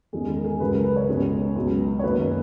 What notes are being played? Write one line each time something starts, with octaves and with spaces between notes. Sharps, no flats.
E2 D#3 G#3 C#4 G#4
G#4
A#4
G#4
C#2 C#3 F#3 B4
A#4
B4
C#5
C#2 B2 G#3 C#4
C#2 B2 F#3 C#4
C#5
F#2 D#3 A#3 C#4 B4
A#4